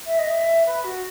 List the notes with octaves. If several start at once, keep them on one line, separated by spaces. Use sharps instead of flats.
E5
D#5
E5
B4
F#4